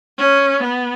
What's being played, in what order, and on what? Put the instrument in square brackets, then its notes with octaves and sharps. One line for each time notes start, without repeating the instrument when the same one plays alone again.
[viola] C#4
B3